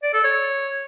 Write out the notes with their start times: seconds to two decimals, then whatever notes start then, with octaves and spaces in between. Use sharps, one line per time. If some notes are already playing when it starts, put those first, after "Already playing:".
0.03 D5
0.13 A4
0.24 C#5